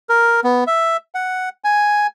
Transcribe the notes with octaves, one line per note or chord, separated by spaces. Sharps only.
A#4
B3
E5
F#5
G#5